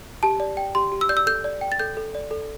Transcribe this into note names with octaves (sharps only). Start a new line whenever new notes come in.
G4 A5
D5
G5
G4 C6
G4
E6
D5 G6
E6
A4 G6
D5
G5
A6
A4 G6
A4
D5
A4